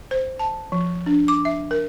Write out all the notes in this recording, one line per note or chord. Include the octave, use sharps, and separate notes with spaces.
C5
A5
F3
D4
D6
E5
A#4